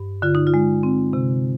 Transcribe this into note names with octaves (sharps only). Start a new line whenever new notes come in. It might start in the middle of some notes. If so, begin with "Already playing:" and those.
Already playing: G2
D3 F4
D#4
F4
G#3
C4
C3